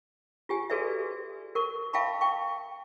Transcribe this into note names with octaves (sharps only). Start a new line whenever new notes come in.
F4 G4 G#5
F#4 G#4 A4 B4 D5 E5
A#4 C#6
E5 F5 G5 A5 B5 C#6
G5 C#6